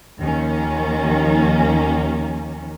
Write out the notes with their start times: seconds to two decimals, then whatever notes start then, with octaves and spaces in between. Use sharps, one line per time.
0.20 D#2 D#3 F3 A#3 C#4